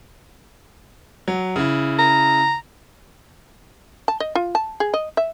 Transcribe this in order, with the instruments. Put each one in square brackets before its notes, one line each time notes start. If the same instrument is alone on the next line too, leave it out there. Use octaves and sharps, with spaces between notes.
[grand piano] F#3
C#3 E4
[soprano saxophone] A#5
[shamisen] A5
D#5
F4
A5
G#4
D#5
E5